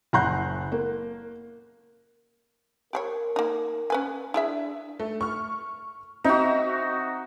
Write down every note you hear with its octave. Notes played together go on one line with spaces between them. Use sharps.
F#1 F#5 A#5 C6 F#6 G6
A#3
G4 G#4 A#4 C#5
A#3 D#4
C#4 B4 G#5
D4 E4 G#4 E5
A3
C#6 F6
C4 D#4 F#4 E5